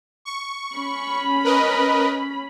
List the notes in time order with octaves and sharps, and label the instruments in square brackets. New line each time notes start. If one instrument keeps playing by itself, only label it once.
[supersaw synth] C#6
[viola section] C#4 B5
[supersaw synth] A#4 B4 D#5